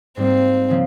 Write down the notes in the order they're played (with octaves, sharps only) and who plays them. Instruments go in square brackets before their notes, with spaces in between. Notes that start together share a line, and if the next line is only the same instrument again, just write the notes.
[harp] G#2 G3 A#3 [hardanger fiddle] C4
[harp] C#3 F3 A#3